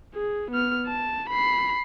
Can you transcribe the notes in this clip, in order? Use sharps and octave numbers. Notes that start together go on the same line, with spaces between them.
G#4
B3 F6
A5
B5 C7